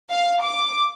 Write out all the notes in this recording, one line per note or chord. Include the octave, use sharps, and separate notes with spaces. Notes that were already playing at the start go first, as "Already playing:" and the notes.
F5
D6